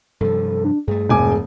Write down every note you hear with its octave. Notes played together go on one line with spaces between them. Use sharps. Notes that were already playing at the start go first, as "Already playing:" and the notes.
G2 C3 F3 A4
D4
G2 A3 G#4
E1 G#5 D6